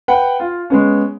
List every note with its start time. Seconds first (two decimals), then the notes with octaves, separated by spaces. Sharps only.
0.08 B4 F#5 G5
0.40 F4
0.70 G#3 B3 C#4